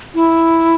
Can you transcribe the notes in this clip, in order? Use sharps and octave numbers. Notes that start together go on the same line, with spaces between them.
E4